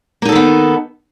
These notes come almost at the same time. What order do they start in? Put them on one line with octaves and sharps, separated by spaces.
A#3 D#4 A4 D#3 B3